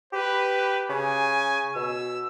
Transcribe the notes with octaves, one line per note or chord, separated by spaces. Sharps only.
G4 B4
C#3 G#5
B2 E6